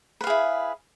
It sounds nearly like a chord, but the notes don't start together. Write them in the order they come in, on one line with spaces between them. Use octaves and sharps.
B4 F5 G#4 E4